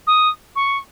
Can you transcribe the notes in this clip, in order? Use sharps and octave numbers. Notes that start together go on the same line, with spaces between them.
D#6
C#6